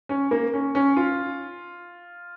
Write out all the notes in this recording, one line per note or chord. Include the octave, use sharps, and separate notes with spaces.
C#4
A#3
C#4
C#4
F4